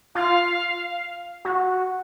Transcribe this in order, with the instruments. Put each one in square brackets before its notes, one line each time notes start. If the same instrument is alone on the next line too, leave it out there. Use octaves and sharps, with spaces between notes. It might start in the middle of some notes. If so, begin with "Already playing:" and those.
[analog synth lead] F4 [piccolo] F5
[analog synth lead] F#4